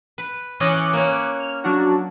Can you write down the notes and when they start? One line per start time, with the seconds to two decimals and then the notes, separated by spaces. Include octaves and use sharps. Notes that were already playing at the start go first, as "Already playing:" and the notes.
0.18 B4
0.60 E3 C#4 D#5 D6 F#6 C#7
0.93 A#3 C#4
1.40 F6
1.64 F#3 D4 F#4